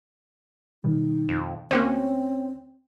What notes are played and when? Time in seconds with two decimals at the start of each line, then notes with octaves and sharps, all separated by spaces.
0.84 B2 D#3 G3 D#4
1.29 F2
1.71 D2 A#3 C4 C#4 F#4 C5